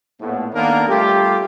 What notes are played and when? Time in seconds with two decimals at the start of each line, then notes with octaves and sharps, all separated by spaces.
0.20 A#1 A2 B3
0.53 D#3 A#3 B3 D4 A4 A#4
0.88 G3 A3 F4 G4